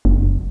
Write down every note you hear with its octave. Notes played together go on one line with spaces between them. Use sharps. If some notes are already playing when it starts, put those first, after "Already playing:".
F#1